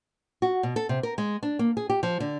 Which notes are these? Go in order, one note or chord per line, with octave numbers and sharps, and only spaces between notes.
F#4
B2
A4
C3
A#4
G#3
D4
A#3
G#4
G4
F3
D3